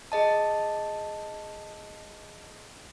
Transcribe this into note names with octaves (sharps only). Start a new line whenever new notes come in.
G#4 D#5 A5